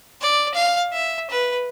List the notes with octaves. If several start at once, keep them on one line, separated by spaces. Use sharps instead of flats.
D5
F5
E5
B4